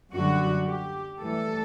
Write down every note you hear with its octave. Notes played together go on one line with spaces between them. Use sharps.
F#2 D3 G3 F#4
G4
A2 E3 G3 A4